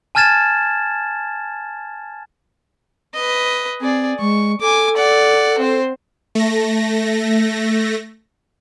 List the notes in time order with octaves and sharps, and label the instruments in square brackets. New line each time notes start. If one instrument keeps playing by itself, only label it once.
[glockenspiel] G#5 A5 F6 G#6 A6 E7
[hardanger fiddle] B4 D#5
[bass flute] C4 [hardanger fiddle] G#4 D5
[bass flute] G#3 [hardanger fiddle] C#6
[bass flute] A4 [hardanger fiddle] G#5 D6
[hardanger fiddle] D5 F#5
C4 C5
[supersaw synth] A3 A#6